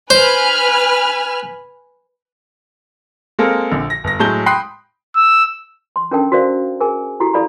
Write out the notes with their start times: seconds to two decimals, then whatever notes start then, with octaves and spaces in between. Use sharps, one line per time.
0.10 B4 C5 G#5 F6
3.39 G#3 A#3 C4 A4 A#4
3.71 A#1 D3
3.90 A#6
4.04 G1 A#6
4.19 A2 F#3 G#3 A5 G6 G7
4.46 G5 B5 C6 D#6 F#6 C7
5.16 E6
5.96 C6
6.11 C#4 D4 A4 A#4 G5 A5
6.32 F#4 A#4 C5 D5 F5
6.80 G#4 A#4 G#5
7.20 E4 F#4 G4 A4
7.34 E4 G4 A4 D5 F5 B5